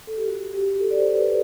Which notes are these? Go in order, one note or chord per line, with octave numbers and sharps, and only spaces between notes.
A4
G4
F#4
G4
A4
D5
C5
B4